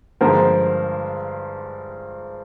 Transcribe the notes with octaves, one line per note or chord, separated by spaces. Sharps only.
G2 D3 F3 G#3 A#4 C5